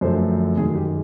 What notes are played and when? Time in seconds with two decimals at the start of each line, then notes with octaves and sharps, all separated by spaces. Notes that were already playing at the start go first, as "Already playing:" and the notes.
0.01 F#2 D3 F3 A3 C5
0.57 F#2 D#3 G#3 G#4
0.75 G4